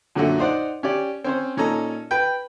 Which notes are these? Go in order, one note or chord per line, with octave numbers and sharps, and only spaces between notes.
F#2 A#2 D3 A3 F#4
D#4 C5 D5 F#5
C#4 G4 D5
C4 C#4 C5
A#2 C#4 D#4 A4 A#5
B4 G5